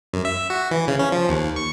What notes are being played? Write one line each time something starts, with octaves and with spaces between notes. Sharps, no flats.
F#2
E5
F#4
E3
C#3
C#4
F3
D#2
C#6